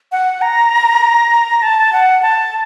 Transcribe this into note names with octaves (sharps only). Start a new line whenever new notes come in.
F#5
A#5
A5
F#5
A5